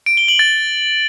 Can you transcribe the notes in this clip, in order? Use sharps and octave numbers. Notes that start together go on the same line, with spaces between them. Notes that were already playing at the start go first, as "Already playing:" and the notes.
D7
G7
F#7
A6